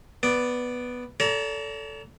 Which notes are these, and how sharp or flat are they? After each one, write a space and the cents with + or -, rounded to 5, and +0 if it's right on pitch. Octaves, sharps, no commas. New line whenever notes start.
B3 +0 D5 +0
A4 +0 D5 -45 A#5 +15